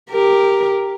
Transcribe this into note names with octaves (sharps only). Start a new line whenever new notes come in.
G4 A#4